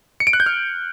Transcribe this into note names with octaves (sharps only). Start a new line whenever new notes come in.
C#7
D7
F#6
G6
F6